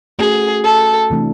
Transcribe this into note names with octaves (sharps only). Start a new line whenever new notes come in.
A3 C#4 F#4 G#4
A4
C3 E3 A3 D4